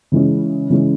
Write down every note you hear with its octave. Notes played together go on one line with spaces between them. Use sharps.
C#3 E3 G#3 C#4
C#3 E3 G#3 C#4